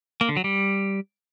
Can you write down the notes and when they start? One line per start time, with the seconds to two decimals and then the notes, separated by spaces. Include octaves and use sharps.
0.21 A#3
0.29 D3
0.37 F#3
0.44 G3